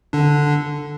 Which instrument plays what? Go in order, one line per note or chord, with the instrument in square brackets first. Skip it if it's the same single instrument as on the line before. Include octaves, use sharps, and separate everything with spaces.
[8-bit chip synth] D3 D4